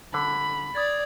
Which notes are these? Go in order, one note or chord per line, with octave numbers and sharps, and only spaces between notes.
D3 B5
D5 D#6 G#6 A6